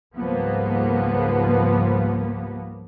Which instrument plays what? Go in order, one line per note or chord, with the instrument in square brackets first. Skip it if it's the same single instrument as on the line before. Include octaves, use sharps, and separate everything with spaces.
[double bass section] C#2 G#2 F3 G3 A#3 B3